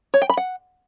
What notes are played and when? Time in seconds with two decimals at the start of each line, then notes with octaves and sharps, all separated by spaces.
0.14 C#5
0.22 G5
0.29 B5
0.37 F#5